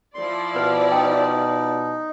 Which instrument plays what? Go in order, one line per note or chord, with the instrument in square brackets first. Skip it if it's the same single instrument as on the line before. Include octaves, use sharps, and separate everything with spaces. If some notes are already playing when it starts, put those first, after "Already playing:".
[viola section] F3 E4 D5 [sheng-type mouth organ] C6
[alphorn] B2 [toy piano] B4
[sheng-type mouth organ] D#4 [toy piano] G5